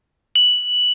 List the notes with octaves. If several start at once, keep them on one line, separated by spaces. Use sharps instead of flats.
F#7